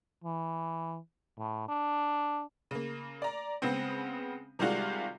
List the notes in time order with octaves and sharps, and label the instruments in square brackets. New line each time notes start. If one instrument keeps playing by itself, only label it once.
[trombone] E3
A2
D4
[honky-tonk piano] C#3 A#3
D5 A#5
C#3 G#3 B3 C4
C3 D#3 G3 G#3 F4 F#4